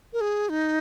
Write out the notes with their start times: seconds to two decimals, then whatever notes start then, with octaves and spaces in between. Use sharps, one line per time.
0.13 A#4
0.21 G#4
0.49 D#4